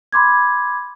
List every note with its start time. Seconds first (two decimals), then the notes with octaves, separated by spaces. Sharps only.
0.13 B5 C6 D6 G#6